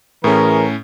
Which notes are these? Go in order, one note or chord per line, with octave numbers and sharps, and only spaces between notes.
A2 E3 C#4 G#4 A#4